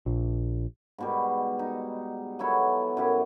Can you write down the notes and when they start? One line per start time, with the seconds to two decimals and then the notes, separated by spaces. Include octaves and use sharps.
0.06 A#1
0.98 G#2 B2 G3
1.59 D#4
2.39 F#3 B3 E4 A4
2.97 F#2 E4 G4